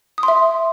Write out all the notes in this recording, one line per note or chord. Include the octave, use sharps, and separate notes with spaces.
D#6
C6
E5